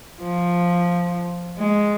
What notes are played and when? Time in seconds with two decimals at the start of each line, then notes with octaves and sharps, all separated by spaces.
0.21 F3
1.59 G#3